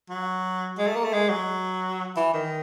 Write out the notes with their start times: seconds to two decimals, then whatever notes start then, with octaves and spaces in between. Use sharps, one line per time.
0.09 F#3
0.78 G#3
0.87 A3
0.96 A#3
1.04 A3
1.13 G#3
1.30 F#3
2.17 E3
2.34 D#3